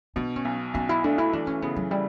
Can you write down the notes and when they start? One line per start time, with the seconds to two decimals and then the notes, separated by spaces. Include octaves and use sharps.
0.16 B2 D4
0.36 C#4
0.45 B1
0.74 B1 C#4
0.89 E4
1.04 A3 D4
1.18 E4
1.33 E3 D4
1.47 C#4
1.62 C#3 B3
1.76 F#3
1.91 G3 E4